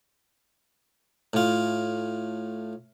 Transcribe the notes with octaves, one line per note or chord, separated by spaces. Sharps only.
A2 F4